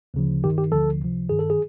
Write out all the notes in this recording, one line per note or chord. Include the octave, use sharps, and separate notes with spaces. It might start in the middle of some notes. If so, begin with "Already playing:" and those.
D2 C#3 F3
G2 D#3 G4
G4
D2 D3 F3 A4
C#2 C3 F3
G2 D#3 G#4
A4
G#4